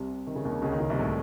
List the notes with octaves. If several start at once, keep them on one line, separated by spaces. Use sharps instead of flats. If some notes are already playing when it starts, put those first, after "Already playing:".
Already playing: C2 C3
D#3
C#3
D#2 D#3
C#2 C#3
D#2 D#3
C#2 C#3
C2 C3
A2